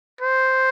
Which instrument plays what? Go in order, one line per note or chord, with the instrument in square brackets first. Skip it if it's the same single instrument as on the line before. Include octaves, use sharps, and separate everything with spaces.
[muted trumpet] C5